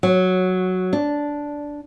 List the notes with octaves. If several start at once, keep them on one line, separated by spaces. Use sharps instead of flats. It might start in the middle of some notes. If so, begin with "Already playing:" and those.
F#3
D4